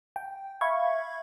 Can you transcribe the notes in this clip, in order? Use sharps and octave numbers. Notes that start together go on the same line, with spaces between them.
G5
E5 F5 B5 C#6 G#6